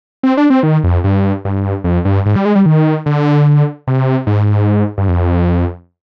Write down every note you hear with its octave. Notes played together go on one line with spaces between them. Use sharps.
C4
D4
C4
D#3
F2
G2
G2
F2
G2
G#2
G3
G#3
G3
D#3
D3
C3
G#2
G2
F2